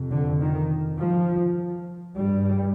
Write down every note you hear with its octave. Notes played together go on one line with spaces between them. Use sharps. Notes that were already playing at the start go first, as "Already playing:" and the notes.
Already playing: F2 C3
D3
D#3
F3
G2 G3